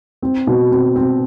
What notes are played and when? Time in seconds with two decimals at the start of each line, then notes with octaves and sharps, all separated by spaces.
0.22 C4
0.47 B2
0.71 C4
0.96 C4